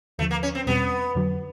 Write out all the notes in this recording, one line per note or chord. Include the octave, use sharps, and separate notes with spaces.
D#2 D3 F3 A3
A#3
C#4
C4
E2 B2 G3 B3 C4
F2 D3 F#3